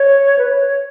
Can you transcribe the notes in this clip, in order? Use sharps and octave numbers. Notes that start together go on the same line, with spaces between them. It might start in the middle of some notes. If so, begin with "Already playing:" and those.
Already playing: C#5
B4
C#5